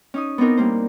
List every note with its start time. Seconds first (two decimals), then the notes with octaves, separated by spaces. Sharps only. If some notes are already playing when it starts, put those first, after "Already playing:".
0.14 C#4 D#4 D#6
0.38 B3 C4 D4 D#4 A#4
0.57 G3 A#3 C5